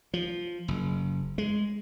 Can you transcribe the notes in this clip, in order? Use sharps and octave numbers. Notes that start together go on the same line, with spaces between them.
F3
F#1
G#3